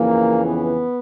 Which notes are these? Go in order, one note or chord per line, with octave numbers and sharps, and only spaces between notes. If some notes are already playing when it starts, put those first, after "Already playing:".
Already playing: F2 C#3 E3 A#3
B3